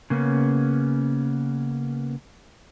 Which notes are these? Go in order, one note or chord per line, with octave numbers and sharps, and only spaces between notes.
C#3 A#3 B3 C#4